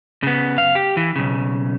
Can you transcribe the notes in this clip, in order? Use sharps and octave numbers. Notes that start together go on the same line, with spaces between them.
C#3 B3
F#2 F5
G4
E3
B1 C#3